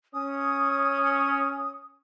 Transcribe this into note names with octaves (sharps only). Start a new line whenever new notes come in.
C#4 D#6